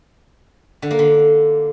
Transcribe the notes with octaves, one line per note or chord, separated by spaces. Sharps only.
D3
A#3
D3